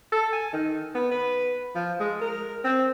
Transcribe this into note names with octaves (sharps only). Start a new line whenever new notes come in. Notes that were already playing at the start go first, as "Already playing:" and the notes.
A4
G#5
D#3
B3
B4
F3
G#3
A#4
C4